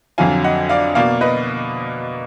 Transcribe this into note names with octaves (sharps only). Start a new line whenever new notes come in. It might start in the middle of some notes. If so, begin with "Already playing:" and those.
F2 D3 F#3 F5 G#5
D#5 F#5
D5 F5
B2 A#3 D5 F5
B4 D#5